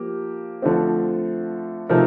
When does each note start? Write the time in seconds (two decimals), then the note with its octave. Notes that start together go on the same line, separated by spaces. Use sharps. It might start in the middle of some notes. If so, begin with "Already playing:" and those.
Already playing: F3 A#3 G4
0.62 D3 F3 A3 C4
1.89 C3 F3 A3 D#4 A#4